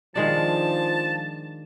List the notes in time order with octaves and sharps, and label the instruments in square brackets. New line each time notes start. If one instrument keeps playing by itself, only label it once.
[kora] D#3 G#3 D4 [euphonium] F3 [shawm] A5